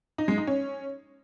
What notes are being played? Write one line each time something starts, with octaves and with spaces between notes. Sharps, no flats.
D#4
G#3
D#4
C#4